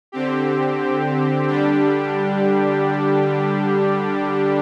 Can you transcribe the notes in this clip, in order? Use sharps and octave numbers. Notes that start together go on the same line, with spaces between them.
D3 C4 G4
D3 G3 D4 G4